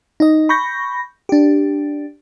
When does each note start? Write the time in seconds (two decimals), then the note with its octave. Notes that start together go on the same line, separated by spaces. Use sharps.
0.20 D#4 D#5
0.49 B5 C#6 G6 A#6
1.29 D4 G4